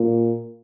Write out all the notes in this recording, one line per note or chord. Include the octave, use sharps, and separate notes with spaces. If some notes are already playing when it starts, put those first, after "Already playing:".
Already playing: A#2